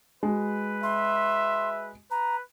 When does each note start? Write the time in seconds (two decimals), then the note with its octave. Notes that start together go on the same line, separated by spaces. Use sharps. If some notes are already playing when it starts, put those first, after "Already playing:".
0.23 G#3 F#4 B4
0.83 E5 C6
2.11 B4 A#5